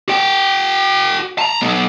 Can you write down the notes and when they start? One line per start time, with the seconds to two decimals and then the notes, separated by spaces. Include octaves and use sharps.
0.08 F#4 G5
1.38 A5 A#5
1.61 F#3 B3